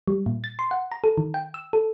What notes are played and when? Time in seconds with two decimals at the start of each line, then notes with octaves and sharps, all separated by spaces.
0.08 G3
0.26 A#2
0.44 A6
0.59 C6
0.71 F#5
0.92 A#5
1.04 A4
1.18 D#3
1.34 G5
1.54 E6
1.73 A4